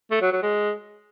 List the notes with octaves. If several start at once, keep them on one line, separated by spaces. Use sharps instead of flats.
A3
F#3
F#3
G#3